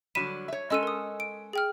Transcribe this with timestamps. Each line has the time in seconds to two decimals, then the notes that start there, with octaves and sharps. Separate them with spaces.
0.15 D3 F#3 G3 B6 D#7 E7
0.48 C#5 E5
0.70 G#3 C#4 A4 D#5 E6 D#7
0.83 A#4 D#6
1.20 D7
1.53 G#4 G5 F6